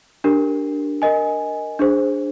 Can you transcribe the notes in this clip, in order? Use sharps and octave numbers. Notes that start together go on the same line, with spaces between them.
D4 G4 A#4
A#4 D#5 G#5
D4 G#4 C5